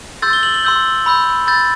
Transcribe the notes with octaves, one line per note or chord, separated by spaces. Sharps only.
C6 E6 G6 A6
G7
F#7
F#7
C6 E6 G6
B5 E6 G6
B5 E6 G6 A6